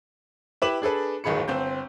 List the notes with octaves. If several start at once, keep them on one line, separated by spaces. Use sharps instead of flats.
E4 G4 B4 D6 E7 F#7
D4 G#4 A4 B4
D1 G1 D#3 G#4 B5 C#7
G1 C4 G6